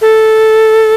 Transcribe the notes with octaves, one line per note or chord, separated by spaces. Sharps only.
A4